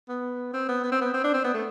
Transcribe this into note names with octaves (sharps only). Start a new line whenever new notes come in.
B3
C4
B3
B3
C4
B3
C4
D4
C4
B3
A3